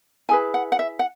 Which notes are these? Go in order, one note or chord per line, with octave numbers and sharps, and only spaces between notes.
E4 G#4 B4 G#5
F#5
F#5
E5
F#5